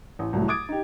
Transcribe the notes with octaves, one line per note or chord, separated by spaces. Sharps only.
A1
C2 A2 F#3 A3
D6 D#6 G#6 A6 D7
D#4 G4